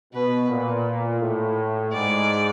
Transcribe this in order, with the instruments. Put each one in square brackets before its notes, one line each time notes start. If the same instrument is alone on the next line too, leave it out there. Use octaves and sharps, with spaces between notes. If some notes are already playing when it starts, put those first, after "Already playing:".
[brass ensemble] B2 [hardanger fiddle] B4
[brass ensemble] A#2
A2
[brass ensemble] G#2 [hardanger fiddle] D5